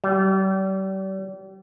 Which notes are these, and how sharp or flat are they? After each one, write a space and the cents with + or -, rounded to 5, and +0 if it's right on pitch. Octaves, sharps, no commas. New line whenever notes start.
G3 -35